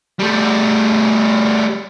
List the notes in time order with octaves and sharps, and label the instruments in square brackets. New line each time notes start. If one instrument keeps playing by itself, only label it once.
[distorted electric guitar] G3 A3